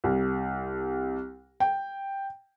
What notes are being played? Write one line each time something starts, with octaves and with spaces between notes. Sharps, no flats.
C2
G5